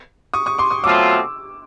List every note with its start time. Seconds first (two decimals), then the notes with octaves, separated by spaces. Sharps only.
0.34 C#6 D#6
0.46 C#6 D#6
0.58 C6 D6
0.71 C#6 D#6
0.84 B2 F#3 A3 C4 F4 D6 E6